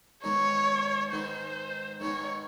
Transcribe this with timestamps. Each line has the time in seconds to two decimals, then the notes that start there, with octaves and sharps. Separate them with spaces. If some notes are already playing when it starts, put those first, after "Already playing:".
0.24 G#2 D#3 G#3 B3 D#4 C#5
1.12 G#2 D#3 G#3 B3 D#4 C5
2.00 G#2 D#3 G#3 B3 D#4 C#5